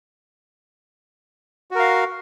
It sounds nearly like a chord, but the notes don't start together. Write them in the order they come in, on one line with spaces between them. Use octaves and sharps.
F#4 A#4 F5